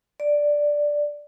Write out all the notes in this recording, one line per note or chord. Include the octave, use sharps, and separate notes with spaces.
D5